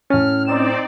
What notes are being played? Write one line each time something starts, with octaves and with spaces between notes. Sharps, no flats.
A2 C#4 A5 F6 A6
C4 D#4 D5 E7